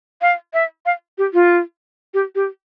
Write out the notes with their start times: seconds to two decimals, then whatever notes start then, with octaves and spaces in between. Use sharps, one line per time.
0.21 F5
0.53 E5
0.86 F5
1.18 G4
1.34 F4
2.14 G4
2.35 G4